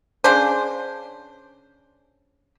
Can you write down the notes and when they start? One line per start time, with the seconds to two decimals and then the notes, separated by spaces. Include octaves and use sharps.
0.24 C#3 D4 C5